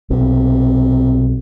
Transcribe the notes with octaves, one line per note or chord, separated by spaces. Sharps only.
B1 C3